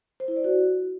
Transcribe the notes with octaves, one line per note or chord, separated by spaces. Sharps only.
C5
E4
D5
F#4